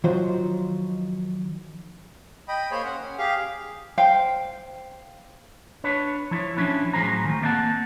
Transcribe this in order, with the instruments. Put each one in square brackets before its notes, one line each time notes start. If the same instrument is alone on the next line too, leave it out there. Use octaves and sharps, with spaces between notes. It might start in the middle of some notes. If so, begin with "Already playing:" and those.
[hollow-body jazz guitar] D#3 F3 F#3 D#4 F4 C5
[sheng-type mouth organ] D#5 G5 B5
A#3 G#4 C5 C#5 G#5 B5
C#4 F#5
C#4
G4 G#4 F5
[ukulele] C5 F5 G5
[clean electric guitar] D4 B4 C#5
F3 E4 C#5
F3 A#3 C#4 D4 E4
A2 F3 F#3 G#4 C5 A#5
D#3 A3
A#3 C4 D5 E5 F#5 A5